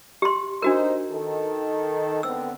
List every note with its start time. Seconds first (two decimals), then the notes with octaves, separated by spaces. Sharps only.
0.22 G4 C6
0.62 D4 D#4 F#4 A#4 C5 D#5
1.11 D#3 A4
2.23 D3 B3 C4 E6